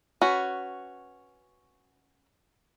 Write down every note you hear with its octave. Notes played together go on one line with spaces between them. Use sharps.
C#4 F#4 B4